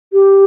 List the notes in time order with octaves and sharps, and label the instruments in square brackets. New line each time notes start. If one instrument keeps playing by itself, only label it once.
[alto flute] G4